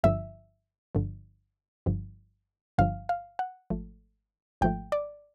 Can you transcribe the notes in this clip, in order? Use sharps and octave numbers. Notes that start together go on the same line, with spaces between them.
G1 G2 D3 F3 E5
G1 G2 D3 F3
G1 G2 D3 F3
G1 G2 D3 F3 F5
F5
F#5
G#1 G#2 F3 A3
G#1 G#2 F3 A3 G5
D5